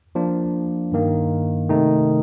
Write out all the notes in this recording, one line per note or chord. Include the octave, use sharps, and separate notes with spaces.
F3 A#3 D4
G2 D#3 A#3
C3 D#3 A3 D#4